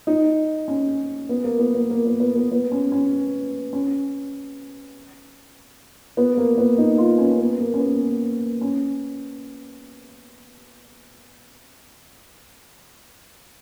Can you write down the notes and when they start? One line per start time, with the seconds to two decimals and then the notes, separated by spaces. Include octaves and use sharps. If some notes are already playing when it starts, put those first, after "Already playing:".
0.07 D#4
0.68 C#4
1.29 B3
1.44 A#3
1.59 B3
1.75 B3
1.90 A#3
2.06 B3
2.20 B3
2.36 B3
2.52 B3
2.72 C#4
2.92 C#4
3.73 C#4
6.17 B3
6.37 A#3
6.58 B3
6.78 D#4
6.98 F4
7.18 C#4
7.31 C#4
7.39 B3
7.60 A#3
7.74 C#4
7.79 B3
8.61 C#4